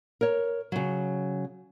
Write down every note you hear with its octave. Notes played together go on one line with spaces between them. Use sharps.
A#4 C#5
C#3 F#3